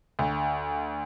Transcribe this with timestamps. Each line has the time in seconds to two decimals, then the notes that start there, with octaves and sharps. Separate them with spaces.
0.19 D2